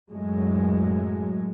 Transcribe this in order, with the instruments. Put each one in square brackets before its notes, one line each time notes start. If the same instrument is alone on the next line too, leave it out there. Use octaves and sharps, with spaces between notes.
[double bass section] F#2 A2 F#3 G#3